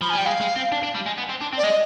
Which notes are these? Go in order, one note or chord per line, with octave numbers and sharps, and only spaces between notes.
F3 B5
G#5
G3 G5
G#3 F5
G#3
C4
D4
D4
G3
G#3
B3
C4
D4
C4
D5
G#3 D#5